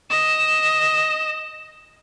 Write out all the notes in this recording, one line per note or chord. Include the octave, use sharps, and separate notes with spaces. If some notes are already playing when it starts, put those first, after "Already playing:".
D#5 E7